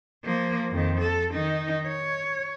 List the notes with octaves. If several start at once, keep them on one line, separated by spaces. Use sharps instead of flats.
F3 A#3
F2 D#3
A4
D#3 D#4
C#5